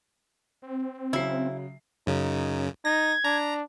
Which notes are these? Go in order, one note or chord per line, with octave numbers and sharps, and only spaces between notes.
C4
C#3 F#3 E4 C7
F#2 C#3 D#4
D#4 G#6 A#6
D4 A#5